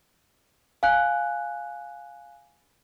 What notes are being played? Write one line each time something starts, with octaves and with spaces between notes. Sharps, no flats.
F5 G#5 F#6